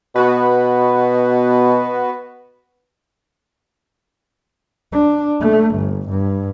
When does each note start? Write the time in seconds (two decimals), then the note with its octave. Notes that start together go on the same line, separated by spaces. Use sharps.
0.16 B2 B3 F#4 B4
4.92 D4
5.40 A3
5.75 G1
6.10 G2